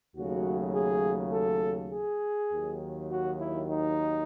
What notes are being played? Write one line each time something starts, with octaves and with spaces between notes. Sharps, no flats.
D#2 C#3 F#3 A3 F#4
G#4
A4
G#4
D#2 D#3 F#3
F#4
E4
D#4